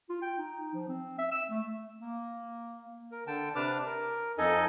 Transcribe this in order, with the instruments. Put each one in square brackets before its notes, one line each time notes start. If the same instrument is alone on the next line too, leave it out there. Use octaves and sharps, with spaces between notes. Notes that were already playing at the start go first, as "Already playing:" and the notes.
[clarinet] F4
G5
D#4
F3
C4
E5
E6
A3
[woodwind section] A#3
[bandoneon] A#4
D3 G5 A5
C3 D4 B4 A5 D6 F6
A#4
F2 D#4 A4 D#5 G#5